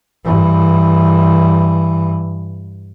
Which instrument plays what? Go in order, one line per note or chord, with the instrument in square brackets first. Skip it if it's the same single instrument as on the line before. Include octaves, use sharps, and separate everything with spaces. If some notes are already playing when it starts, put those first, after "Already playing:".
[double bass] G2 E3